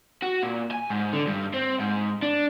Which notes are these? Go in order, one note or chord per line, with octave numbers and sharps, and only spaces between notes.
F#4
A#2
G#5
G#2
D3
G2
C4
G#2
D4